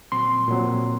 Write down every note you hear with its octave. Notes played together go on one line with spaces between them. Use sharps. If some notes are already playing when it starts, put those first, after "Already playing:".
A#2 F#3 C4 C6
A#2 F#3 C4